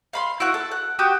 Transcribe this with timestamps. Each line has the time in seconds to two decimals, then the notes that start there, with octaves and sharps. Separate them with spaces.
0.13 F5 B5 C6
0.40 E4 F#4 F#5
0.54 A4
0.71 F#5
0.99 F#4 G4 D#6 G6